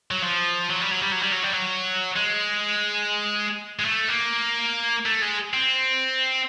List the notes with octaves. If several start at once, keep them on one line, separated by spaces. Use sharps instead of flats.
F#3
F3
F#3
G3
F#3
G3
F#3
G3
F#3
G3
F#3
G#3
G#3
A3
A#3
A3
G#3
C4